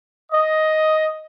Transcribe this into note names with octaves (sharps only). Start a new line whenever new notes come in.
D#5